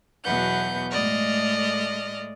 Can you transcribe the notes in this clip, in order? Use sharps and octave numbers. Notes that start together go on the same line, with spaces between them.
E2 B2 F#3 B4 F#5 G6
A2 G#3 A3 D5 D#5 F6